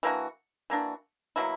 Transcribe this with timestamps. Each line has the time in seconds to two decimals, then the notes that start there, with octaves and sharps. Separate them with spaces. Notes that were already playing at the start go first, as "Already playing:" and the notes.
0.03 E3 A#3 D4 F#4
0.70 E3 A#3 D4 F#4
1.36 B2 F#3 A#3 E4